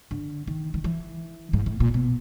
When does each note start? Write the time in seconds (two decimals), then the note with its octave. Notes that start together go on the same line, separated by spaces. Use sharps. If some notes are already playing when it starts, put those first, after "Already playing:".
0.11 D3
0.47 D#3
0.74 D#3
0.84 E3
1.53 G#2
1.66 A2
1.80 A#2
1.94 B2